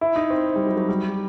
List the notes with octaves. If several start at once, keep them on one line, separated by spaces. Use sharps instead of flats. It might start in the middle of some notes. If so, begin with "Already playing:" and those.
E4
D#4
C4
G3
F#3
F#3
G3